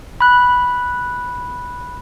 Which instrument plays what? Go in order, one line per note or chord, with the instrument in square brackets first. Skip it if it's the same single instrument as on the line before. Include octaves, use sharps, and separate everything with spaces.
[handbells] B5 F#6